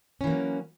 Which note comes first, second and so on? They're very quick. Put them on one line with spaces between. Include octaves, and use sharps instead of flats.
C#4 E3 A#3 F#3